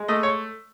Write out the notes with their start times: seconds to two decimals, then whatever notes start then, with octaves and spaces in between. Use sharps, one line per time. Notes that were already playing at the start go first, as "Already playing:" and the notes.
Already playing: G#3
0.08 A3 D#5
0.23 C#5